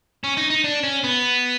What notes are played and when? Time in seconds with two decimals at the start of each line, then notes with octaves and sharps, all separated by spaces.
0.24 C#4
0.37 D#4
0.50 D#4
0.64 D4
0.84 C#4
1.04 B3